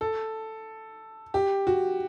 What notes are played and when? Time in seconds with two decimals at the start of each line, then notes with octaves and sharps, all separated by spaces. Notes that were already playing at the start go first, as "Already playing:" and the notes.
0.01 A4
1.34 G4
1.67 F#4